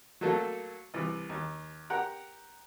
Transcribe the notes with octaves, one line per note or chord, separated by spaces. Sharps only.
F#3 A3 A#3 A4
C2 E3
D#2
G4 A#4 F#5